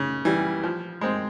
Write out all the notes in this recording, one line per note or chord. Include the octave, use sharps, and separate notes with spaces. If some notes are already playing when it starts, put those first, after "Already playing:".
Already playing: C#3
E3 G3
F3
G#3 C4